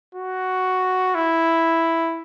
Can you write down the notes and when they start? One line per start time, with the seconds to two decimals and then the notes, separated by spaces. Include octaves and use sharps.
0.15 F#4
1.15 E4